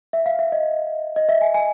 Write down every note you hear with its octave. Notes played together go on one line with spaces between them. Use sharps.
E5
F5
E5
D#5
D#5
E5
G#5
G#5